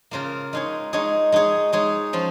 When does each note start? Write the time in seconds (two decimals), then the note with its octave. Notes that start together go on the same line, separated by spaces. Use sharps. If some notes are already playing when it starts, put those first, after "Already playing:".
0.11 C#3 A#3 F4 A#4
0.53 G#3 D#4 G#4 C#5
0.93 G#3 D#4 G#4 C#5
1.32 G#3 D#4 G#4 C#5
1.73 G#3 D#4 G#4 C#5
2.13 F3 C#4 F4